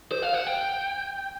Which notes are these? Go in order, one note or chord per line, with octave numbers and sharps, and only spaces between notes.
C5
F5
F#5
G5